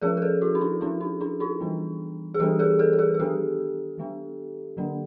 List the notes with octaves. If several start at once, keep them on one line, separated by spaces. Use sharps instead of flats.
F3 G#3 C#4 G#4 A#4
A#4
A4 B4
E4 F#4
D#4
D4 E4
F3 G#3 C#4 D4 E4
D#4
D4 E4
D#4 F4
E3 G3 B3 D4
G#4
E3 G3 B3 D4 G4 A4
G#4 A#4
A4 B4
A4
G#4 A#4
G#4
D#3 G#3 B3 D4 G4 A4
D#3 G#3 B3 D4
D3 F#3 A#3 D4